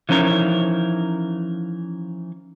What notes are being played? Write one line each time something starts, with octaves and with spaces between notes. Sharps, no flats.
E3 F3 C#4 D#4 A#4